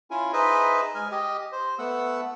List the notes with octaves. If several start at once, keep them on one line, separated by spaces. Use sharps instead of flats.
C#4 E4 F4 G#5
D#4 G#4 B4 C5 D#5 E5
G#3 G#5 F6
G4 D#5
C5
A3 B3 F#5 E6